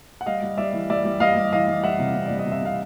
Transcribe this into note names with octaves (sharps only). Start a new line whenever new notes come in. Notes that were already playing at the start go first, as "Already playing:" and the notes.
F#5
G3 D#5 F5
G3
G3 D5 E5
E3
G3 D5 E5
G3
G3 D#5 F5
G3
E3 D#5 F5
E3
G3 E5 F#5
C3
C3
G3 D5
D#5
C3
E5
C3 F5